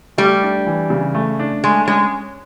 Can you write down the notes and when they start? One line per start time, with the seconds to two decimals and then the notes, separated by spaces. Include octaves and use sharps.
0.18 G3 A3
0.43 D4
0.66 E3
0.90 C#3
1.15 A3
1.39 D4
1.64 G#3 A3
1.87 G#3 C#4